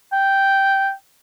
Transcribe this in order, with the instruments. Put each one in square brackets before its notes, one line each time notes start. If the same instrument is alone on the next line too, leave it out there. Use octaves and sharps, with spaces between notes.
[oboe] G5